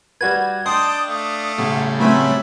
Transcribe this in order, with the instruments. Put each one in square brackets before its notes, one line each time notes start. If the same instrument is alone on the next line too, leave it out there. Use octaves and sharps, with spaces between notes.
[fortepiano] G3 F#4 B4 [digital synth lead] G#6
[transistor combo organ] D4 [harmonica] D#5 G5 A5 [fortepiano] C6 [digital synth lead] D#6
[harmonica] A3 F5
[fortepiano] B1 [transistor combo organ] A2 C#3 G3
[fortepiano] F#3 C4 C#4 [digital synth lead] A3 [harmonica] B4 E5 B5